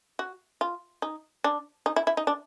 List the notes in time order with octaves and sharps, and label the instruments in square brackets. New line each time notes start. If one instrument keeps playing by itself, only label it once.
[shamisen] F#4
F4
D#4
D4
D#4
E4
E4
D#4
D4